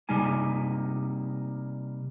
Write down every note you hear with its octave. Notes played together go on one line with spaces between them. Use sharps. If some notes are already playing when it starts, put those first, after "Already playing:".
C3 G3 A#3 D#4 G#5